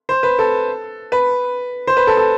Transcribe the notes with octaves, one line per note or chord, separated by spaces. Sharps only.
C5
B4
A4
B4
C5
B4
A4
A4